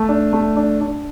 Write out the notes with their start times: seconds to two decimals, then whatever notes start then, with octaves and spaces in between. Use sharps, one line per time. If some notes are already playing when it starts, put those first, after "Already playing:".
Already playing: A3
0.09 D4
0.33 A3
0.56 D4
0.81 D4